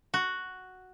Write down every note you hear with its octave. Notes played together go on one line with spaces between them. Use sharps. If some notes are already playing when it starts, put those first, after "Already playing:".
F#4